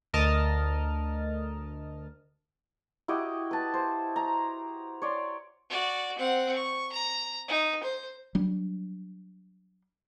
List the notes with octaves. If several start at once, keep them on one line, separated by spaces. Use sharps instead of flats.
D2 A#4 D#5 A5 F6
E4 F#4 G4 D#5
B4 A5
C5
A#5
C#5 D5 C6
F#4 D5
C4 F#5
C#6
A#5
D#4
C5
F#3 G3 D4